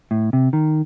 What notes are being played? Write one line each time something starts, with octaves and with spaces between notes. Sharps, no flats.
A2
C3
D#3